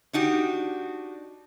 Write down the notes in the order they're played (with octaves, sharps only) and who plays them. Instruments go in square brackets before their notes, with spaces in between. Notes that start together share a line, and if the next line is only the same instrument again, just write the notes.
[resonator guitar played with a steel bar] D4 D#4 F#4 G4